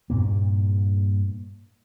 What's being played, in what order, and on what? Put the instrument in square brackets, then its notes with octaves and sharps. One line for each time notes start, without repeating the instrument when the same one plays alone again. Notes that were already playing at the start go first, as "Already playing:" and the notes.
[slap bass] G2 A#2 A#3